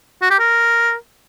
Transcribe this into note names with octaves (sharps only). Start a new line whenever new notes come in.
F#4
G4
A#4